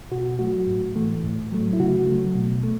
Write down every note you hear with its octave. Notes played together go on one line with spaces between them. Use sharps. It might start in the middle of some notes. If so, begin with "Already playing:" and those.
B2 F#4
F#3 A3 F#4
A2
E3 A3
A2
F#3 A3
E4
C#3 F#4
F#3 A3
B2
A3